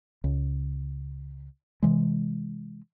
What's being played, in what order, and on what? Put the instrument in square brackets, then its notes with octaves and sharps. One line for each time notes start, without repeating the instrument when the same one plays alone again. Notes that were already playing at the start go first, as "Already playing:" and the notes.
[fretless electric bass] C#2
C3 E3 G#3